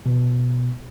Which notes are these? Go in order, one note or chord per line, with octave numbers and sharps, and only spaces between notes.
B2